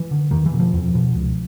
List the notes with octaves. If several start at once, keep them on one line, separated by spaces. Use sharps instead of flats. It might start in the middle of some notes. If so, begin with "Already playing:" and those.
Already playing: E3
D3
E2 D#3
E3
B2
F3
E2
B2
C#2